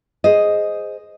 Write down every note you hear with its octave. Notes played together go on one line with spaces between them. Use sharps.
G#4 C5 D#5